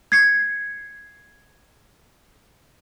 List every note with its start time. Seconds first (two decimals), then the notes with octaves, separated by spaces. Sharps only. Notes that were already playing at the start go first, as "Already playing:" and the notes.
0.12 G#6 C7 C#7